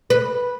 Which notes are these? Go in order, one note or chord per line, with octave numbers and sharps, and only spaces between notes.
B4